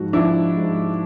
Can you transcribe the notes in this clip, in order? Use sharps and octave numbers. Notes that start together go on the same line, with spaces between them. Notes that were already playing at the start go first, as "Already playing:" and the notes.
Already playing: G#2 F3 F#4
F3 D4 E4
G#2